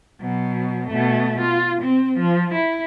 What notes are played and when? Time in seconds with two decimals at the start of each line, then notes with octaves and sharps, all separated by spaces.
0.21 B2 F#3
0.88 B2 A3
1.40 F4
1.82 C4
2.19 F3
2.54 E4